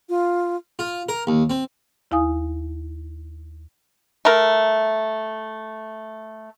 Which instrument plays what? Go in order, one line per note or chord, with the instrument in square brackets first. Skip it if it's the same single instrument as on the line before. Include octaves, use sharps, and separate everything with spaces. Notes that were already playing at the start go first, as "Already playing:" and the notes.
[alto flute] F4
[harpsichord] F4
A#4
D#2
C4
[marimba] D#2 E4 F5 G#5 D#6
[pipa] A3 A#4